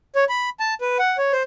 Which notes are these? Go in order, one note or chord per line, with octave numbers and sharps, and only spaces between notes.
C#5
B5
A5
B4
F#5
C#5
C5